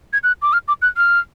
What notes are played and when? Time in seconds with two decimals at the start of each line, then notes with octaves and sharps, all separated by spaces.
0.13 G#6
0.23 F#6
0.42 D6
0.53 F6
0.68 D6
0.82 F#6
0.97 F6